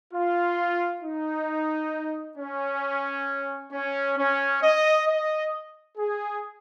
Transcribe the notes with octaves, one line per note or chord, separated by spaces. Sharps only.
F4
D#4
C#4
C#4
C#4
D#5
D#5
G#4